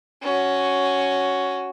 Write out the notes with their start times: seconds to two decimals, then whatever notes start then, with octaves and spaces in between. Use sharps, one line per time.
0.22 C#4 F#4